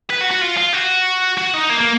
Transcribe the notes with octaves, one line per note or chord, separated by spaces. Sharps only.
B4
F#4
F#4
F4
F4
F#4
F#4
D#4
A#3
A#3